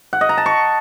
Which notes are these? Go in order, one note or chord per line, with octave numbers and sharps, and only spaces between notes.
F#5
D#5
A#5
A5
C#6